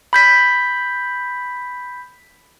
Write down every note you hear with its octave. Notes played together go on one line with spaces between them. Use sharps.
B5 G6 B6